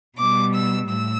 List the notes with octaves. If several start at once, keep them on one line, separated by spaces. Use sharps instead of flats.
B2 G3 D6
E6
A2 E6